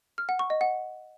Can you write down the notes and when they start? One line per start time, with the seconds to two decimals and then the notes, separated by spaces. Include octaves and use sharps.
0.18 F6
0.29 F#5
0.39 C#6
0.50 D#5
0.61 F#5